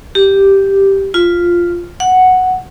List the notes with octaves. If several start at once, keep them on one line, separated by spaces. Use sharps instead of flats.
G4
F4
F#5